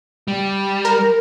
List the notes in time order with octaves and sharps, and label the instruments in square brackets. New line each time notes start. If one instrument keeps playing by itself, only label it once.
[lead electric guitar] G3
[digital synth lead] A#4